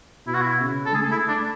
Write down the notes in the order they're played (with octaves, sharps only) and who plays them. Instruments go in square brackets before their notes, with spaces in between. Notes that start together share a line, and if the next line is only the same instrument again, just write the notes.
[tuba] B2 [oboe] E4
[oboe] F#4
E4
[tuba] C#3
[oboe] A4
[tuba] A3 [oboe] G#4
[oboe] E4
D4